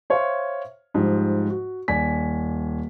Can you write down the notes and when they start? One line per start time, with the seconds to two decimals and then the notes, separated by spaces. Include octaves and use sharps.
0.10 C5 C#5 E5 F5 C6
0.94 G#2 F3 G3
1.50 F#4
1.88 D#1 D5 G#5 B6